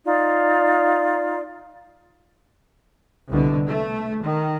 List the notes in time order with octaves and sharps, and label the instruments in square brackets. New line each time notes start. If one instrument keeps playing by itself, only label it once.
[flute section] D#4 F4 D5
[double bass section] C2 B2 D3
A3
D#3